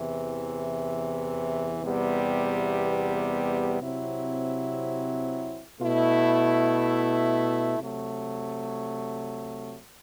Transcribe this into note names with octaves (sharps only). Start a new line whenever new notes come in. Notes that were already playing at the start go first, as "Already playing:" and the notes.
Already playing: E2 C3 E3
E2 C3 G3 B3
C3 F#3 C4 E4
B2 A3 E4
C3 F#3 A3